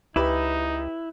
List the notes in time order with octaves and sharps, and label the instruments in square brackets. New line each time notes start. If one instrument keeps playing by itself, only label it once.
[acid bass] C#2 [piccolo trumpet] D#4 [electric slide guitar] E4 [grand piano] G4 B4